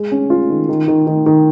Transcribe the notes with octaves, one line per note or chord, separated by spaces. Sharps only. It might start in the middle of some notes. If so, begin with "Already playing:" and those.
Already playing: G#3
C#4
F4
D#3
D#3
D#3
D#3
D#3